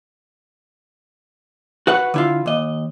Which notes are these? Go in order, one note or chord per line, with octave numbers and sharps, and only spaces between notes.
F#4 B4 F#5
D3 E4 F4
D#2 D#5